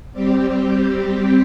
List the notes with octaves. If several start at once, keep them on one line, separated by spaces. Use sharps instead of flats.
G3 C4 G4